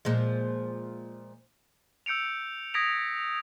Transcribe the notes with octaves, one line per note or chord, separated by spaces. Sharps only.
A#2 F3 G#3
E6 G6 C#7 D7 F7
D#6 G#6 A#6 B6 D7 F7